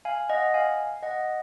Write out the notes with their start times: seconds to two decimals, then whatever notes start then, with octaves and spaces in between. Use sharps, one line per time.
0.05 F5 G#5
0.29 D#5 F#5
0.54 F5 G#5
1.02 D#5 F#5